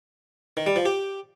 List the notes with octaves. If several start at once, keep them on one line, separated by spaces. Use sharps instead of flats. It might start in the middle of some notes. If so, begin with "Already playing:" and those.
D#3
G3
F3
G4